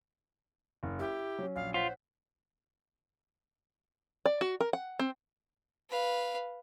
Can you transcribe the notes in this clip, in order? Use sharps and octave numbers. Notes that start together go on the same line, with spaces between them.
F#1
E4 G4
F#3 C#4
A#1 F5
F4 C5 C#5 F#5 B6
D5
F#4
A#4
F#5
C4
B4 F5